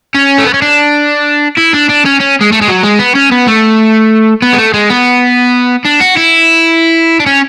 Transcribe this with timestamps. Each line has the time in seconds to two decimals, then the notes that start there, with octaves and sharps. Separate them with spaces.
0.15 C#4
0.38 A3
0.46 B3
0.54 C#4
0.62 D4
1.57 E4
1.73 D4
1.89 D4
2.05 C#4
2.20 C#4
2.41 G#3
2.52 A3
2.61 G#3
2.68 F#3
2.83 G#3
2.99 B3
3.15 C#4
3.32 B3
3.48 A3
4.42 B3
4.53 G#3
4.58 A3
4.74 G#3
4.90 B3
5.85 D4
6.00 F#4
6.17 E4
7.20 D4
7.26 C#4